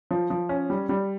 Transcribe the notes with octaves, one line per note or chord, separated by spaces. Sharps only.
F3
F3
C#4
G3
G3